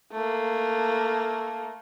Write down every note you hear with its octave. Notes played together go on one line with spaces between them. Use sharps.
A3 A#3